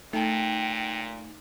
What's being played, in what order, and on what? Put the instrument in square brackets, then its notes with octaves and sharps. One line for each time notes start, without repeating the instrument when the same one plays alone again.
[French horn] A#2 [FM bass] A3 [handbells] D#4 A5 [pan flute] G5